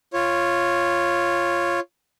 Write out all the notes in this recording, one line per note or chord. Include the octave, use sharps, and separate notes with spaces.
F4 C#5